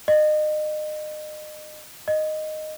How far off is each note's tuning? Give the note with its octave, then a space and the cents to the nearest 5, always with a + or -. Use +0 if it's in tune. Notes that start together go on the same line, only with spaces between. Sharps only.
D#5 -30
D#5 -10